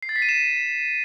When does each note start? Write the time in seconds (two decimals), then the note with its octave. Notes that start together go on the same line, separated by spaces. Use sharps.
0.03 C7
0.09 A6
0.16 B6
0.22 D#7
0.29 E7